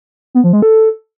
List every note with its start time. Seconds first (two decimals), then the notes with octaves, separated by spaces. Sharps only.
0.35 B3
0.44 F3
0.53 G#3
0.62 A4